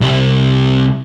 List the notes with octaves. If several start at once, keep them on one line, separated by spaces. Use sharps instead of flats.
C2 G3